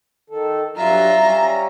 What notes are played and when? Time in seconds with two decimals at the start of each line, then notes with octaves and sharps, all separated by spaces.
0.30 D#3 A4
0.76 G2 F#3 G3 F4 E5 A#5
1.18 G3 C#4